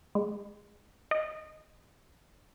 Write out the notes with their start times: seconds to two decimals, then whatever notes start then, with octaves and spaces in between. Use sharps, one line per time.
0.15 G#3
1.11 D#5